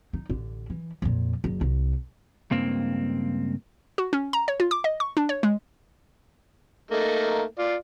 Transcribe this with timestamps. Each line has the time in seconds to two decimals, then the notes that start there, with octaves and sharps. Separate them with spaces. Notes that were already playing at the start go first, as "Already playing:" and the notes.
0.13 D#4
0.29 A1 D3
0.70 E3
1.02 F2 A#2
1.44 F#1
1.61 C2
2.51 C#2 G2 A#3 C4
3.98 F#4
4.13 C#4
4.33 A#5
4.48 C#5
4.60 F4
4.71 D6
4.84 D#5
5.00 C#6
5.17 D4
5.29 C#5
5.43 G#3
6.91 A3 A#3 D#4
7.58 F4 D5